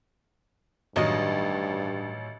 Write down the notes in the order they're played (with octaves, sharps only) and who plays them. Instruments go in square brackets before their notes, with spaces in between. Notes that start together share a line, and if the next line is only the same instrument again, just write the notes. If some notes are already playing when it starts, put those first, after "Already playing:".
[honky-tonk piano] A1 F#3 [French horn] G2 [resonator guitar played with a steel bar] D#3 D#5